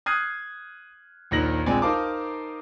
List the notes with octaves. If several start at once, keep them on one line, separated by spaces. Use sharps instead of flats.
D#6 F6 F#6 G#6 C7 D#7
A#1 D#2 D#3 A#6 F#7
A#1 G#3 C4 D5 G#5
D#4 A#4 C5 F5 A5 D6